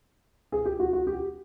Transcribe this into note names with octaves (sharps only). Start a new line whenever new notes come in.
G#4
G4
F#4
F#4
G4